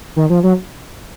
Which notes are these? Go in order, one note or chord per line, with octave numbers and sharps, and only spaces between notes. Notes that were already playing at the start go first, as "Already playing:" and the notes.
D#3
F3
F#3